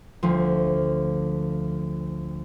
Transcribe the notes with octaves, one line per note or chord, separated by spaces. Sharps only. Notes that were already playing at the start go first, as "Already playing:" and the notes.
D2 F3